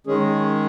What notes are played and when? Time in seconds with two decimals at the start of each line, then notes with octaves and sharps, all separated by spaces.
0.07 D#3 G#3 C#4 G#4